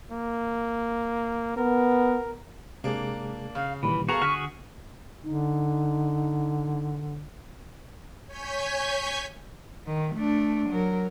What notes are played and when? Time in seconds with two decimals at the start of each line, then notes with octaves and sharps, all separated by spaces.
0.11 A#3
1.57 B3 A#4
2.84 C3 G#3 A#3 D4 G#4
3.55 C#3 F5
3.83 A#2 D#3 E3 G3 B5
4.09 B3 F#4 G#4 A4 F5 A#5 C#6
4.22 D3 F#4 G#4 F6 B6
5.24 D3 D#4
8.27 C#5 G#5 C#6 G6 G#6 B6
9.86 D#3
10.15 A3 D4
10.70 F#3 A#4